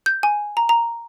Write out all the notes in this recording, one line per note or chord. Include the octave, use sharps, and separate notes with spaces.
G6
G#5
A#5
A#5